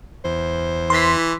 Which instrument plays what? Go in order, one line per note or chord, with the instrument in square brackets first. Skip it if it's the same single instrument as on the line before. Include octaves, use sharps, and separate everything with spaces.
[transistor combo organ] E2 [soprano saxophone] C5
[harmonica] E3 [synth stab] C6 B6